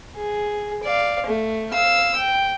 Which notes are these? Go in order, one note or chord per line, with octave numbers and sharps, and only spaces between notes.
G#4
D5 F5
A3
F5 E6
G5